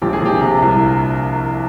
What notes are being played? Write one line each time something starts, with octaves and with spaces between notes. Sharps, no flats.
A#1 G4
G#4
A#1 G4
C3
C2